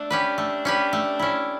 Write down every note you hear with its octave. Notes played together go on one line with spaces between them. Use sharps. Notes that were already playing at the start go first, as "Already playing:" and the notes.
Already playing: A3 D4
C#4 G4 B4
A3
C#4 G4 B4
A3
C#4 E4